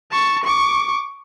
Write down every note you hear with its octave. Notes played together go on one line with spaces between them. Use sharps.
A5 C#6
C#6 D6